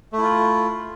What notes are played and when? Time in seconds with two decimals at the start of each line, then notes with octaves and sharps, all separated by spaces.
0.13 A3
0.18 E4
0.23 F4